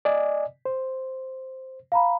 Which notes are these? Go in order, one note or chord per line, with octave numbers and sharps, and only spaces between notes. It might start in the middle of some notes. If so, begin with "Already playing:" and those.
D5 D#5 G#5
C5
F5 A#5 B5